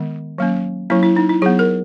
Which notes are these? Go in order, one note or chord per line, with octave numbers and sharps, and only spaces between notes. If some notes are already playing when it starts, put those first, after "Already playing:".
Already playing: D#3 G#3 B3
F#3 A#3 C#4
F#3 A#3 C#4 E4
E4
D#4
E4
F#3 B3 G#4
A#4